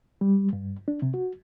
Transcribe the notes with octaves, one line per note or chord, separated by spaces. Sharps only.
G3
G2
D4
C3
F#4